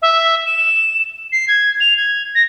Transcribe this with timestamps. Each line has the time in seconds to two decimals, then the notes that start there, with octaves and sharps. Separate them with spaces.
0.02 E5
0.46 E7
1.32 C7
1.48 G#6
1.80 F7
1.97 G#6
2.35 A#6